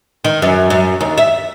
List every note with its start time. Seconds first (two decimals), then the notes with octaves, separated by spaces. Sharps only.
0.24 D#3
0.42 F#2
0.70 F#2
1.01 D#2
1.18 E5